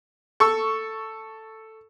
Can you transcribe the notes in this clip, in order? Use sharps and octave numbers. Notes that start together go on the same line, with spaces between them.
A4 C#6 E6